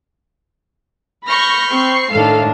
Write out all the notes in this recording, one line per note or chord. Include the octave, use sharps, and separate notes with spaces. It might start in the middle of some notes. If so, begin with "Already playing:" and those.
B5 C#6 F6 G6 A#6
C4 C#6 C7
A2 D#3 D4 A4 F5